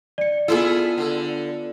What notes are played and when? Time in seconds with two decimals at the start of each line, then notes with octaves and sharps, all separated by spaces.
0.18 D5 C#7
0.48 B3 E4 F4 G#4 A4
0.98 D3